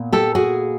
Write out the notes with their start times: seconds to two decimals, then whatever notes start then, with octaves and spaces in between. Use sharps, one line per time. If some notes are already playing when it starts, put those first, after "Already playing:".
Already playing: A#2 B3
0.13 G4 A4
0.35 F#4 G#4